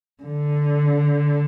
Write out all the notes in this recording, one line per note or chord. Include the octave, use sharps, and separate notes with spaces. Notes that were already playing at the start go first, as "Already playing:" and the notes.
D3